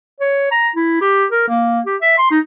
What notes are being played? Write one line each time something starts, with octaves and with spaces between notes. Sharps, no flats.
C#5
A#5
E4
G4
A#4
A#3
G4
E5
C6
D#4